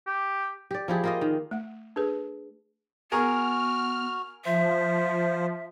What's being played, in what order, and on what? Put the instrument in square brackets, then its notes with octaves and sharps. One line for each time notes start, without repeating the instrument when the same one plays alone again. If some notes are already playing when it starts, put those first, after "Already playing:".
[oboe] G4
[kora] G4 D5
F3 E4 G4 G#4
A#3 F4 D#5
D#3
[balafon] A3 F#5
D4 G#4 A4 B4
[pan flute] B3 [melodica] F#4 [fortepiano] G#4 A#4 G#5 [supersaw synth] F6
[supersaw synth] F3 [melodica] C5 [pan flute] E5